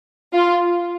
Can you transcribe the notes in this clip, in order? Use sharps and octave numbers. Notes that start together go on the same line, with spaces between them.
F4